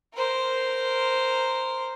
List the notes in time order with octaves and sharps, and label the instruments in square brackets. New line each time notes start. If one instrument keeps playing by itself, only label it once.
[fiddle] A#4 C5